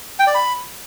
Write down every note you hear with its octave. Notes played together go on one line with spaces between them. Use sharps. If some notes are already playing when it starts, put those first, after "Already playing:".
G5
D5
B5